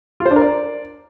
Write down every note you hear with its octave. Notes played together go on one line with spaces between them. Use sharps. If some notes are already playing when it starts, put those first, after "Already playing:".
F4
C5
D4
A#4
D5